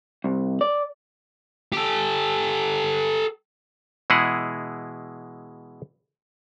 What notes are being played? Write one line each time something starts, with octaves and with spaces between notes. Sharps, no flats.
C2
D5
G4 A4
B2 E3 G#3 E4 G#4 F#5